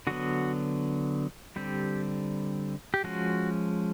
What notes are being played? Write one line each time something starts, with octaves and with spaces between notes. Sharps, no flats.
D3 F#3 B3 F#4
D3 G3 C4 G4
G4
F3 G#3 C#4 F#4